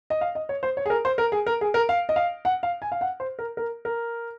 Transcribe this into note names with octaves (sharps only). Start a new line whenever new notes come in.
D#5
F5
D#5
C#5
C5
C#5
G#4
A#4
C5
A#4
G#4
A#4
G#4
A#4
F5
D#5
F5
F#5
F5
G#5
F5
F#5
C5
A#4
A#4
A#4